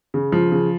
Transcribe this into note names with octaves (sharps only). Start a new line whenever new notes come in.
C#3
F3
C#3